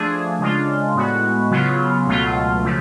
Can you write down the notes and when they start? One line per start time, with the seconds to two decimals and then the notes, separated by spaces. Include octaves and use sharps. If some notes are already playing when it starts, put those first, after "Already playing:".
Already playing: F3 A3 D4 G#4
0.39 C#3 G#3 D4 F4
0.95 A2 G#3 B3 F#4
1.51 C#3 F#3 B3 F4
2.07 C#2 B2 F#3 A3 F4
2.64 C#3 F3 A3